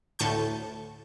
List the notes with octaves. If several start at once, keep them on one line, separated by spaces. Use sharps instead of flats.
D2 A2 A5 C#6 G6